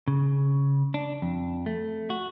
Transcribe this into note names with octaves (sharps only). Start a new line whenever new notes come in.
C#3
D4
F2
A3
F#4